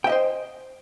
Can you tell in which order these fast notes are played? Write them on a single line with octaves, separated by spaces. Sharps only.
G5 E5 D#5 C5